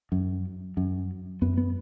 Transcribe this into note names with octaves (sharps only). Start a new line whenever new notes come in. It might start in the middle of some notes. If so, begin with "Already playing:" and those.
F#2
F#2
F#2 B3
B3